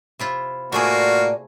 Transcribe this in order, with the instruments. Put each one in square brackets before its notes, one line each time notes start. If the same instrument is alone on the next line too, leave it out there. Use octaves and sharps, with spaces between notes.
[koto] C3 E4 F4
[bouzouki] A2 D5 G#5 [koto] A3 G#4 [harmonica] A#3 F4 F#4